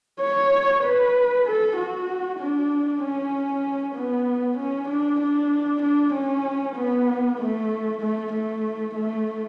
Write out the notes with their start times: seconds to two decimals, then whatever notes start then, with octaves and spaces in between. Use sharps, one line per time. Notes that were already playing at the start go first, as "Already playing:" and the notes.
0.20 C#5
0.83 B4
1.46 A4
1.76 F#4
2.39 D4
3.02 C#4
3.95 B3
4.58 C#4
4.88 D4
5.21 D4
5.82 D4
6.13 C#4
6.76 B3
7.39 A3
8.01 A3
8.32 A3
8.95 A3